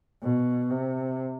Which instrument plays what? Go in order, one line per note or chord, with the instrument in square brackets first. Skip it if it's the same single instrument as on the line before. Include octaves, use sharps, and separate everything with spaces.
[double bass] B2
C3